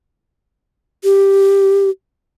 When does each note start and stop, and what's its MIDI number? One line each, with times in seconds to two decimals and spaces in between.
1.04 1.90 67